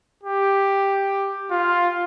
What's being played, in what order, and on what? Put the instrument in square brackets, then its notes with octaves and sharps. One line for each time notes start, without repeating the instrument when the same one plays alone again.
[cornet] G4
F4